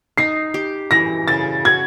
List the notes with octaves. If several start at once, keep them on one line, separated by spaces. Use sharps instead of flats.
D#4 C7
G4
E3 A#6
C#3 A6
F#4 G#6